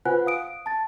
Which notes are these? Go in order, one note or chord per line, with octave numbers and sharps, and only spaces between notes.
F4 B4 C5 F#5 G#5 F#6
F5 D#6 D7
A5 A6